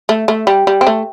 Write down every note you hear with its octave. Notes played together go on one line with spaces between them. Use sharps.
A3
A3
G3
G3
C4
A3